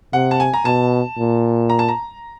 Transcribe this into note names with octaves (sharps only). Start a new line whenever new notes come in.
C3 F#5
A5
G#5
A#5
B2 A5
A#2
A#5
A5
A#5